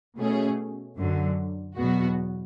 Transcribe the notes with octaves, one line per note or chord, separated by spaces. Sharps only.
B2 A3 C#4 G#4
F#2 D3 F#3
E2 B2 F#3 B3 F#4